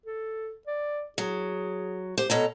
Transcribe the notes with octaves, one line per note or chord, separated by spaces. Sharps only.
A4
D5
F#3 G#4
G4 C5
B2 A4 C#5 A#5